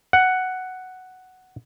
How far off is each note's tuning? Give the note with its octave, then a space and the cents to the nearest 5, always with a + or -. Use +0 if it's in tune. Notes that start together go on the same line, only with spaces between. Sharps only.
F#5 +5